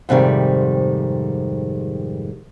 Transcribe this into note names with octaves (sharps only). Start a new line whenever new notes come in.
F2 G#2 C3 D#3 G3